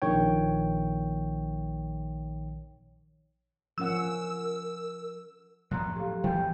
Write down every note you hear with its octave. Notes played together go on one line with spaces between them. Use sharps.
A#1 D#3 C#5 G5
F3 C#4 A#4 F#5 E6
A2 F3 F#3 A#5 C6 F#6
G4 A4 F5
E3 F3 B3 G5 G#5 G6